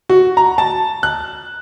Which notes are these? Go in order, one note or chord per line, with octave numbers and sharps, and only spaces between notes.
F#4
A#5
A5
F#6